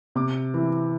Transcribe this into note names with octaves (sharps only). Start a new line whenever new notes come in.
C3 D6
E3